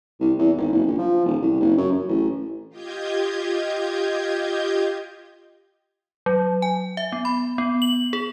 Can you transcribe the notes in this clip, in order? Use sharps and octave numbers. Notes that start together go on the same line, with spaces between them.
C2
E2
G#1
F#1
A#1
F3
D#1
C2
F#1
F#2
F#2
A1
F4 G4 D#5 G6 G#6
F#3
G#5
E5
B3
B5
B3
F#7
G#4